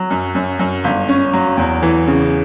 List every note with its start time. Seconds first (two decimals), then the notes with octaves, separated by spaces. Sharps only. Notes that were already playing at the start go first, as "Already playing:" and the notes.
Already playing: F#3
0.10 F#2
0.35 F#2
0.59 F#2
0.84 G1
1.09 C#4
1.33 F#3
1.57 E2
1.82 E3
2.07 C#3